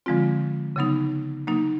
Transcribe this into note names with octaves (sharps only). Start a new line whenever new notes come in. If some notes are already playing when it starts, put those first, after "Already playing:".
D3 F3 G#3 C4 F4
C#3 F#3 B3 D#4
F#3 A#3 D#4